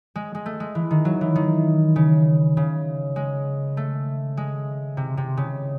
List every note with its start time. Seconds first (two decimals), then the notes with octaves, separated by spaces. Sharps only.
0.15 G#3
0.35 G#3
0.46 A3
0.60 G#3
0.75 E3
0.91 D#3
1.05 F#3
1.21 E3
1.36 D#3
1.96 C#3
2.57 C#3
3.16 G#3
3.77 A3
4.37 G#3
4.97 C3
5.17 C3
5.37 C#3